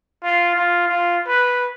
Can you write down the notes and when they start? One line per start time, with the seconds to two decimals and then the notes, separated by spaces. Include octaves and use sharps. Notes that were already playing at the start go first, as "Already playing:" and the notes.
0.23 F4
0.55 F4
0.88 F4
1.27 B4